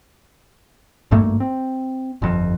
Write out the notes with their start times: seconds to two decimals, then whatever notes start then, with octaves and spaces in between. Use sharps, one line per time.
1.11 G#1 G2 A3 A#3
1.40 C4
2.22 G1 F2